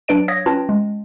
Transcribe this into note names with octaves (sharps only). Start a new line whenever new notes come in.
F#3 D4 B4 D5 D7
C#5 F5 D#6 G#6 A#6
C#4 F4 B4 G5 A5
G#3